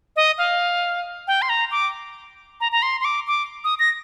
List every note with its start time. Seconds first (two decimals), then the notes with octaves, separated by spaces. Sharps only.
0.16 D#5
0.38 F5
1.28 G5
1.42 C6
1.49 A#5
1.71 D6
2.61 A#5
2.72 A#5
2.82 C6
3.01 C6
3.05 D6
3.27 D6
3.64 D#6
3.79 A#6